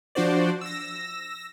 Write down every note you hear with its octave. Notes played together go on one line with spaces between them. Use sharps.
F3 D4 F#4 C5 D5
E6 A#6